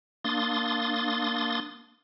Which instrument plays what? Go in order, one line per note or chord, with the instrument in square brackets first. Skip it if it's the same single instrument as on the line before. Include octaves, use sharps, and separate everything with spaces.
[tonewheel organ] A#3 D4 C6 D#6 A6